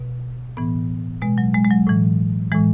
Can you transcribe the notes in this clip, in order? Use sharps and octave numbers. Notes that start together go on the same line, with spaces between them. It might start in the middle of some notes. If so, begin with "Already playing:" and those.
Already playing: B2
A2 E3 B3
B2 G#3
F#3
G#3
G#3
F#3
A2 E3
A2 E3 G#3